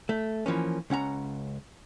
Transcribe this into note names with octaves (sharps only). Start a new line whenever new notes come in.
A3
E3 F3 A#3 C#4
C#2 C#4 F#5 A#5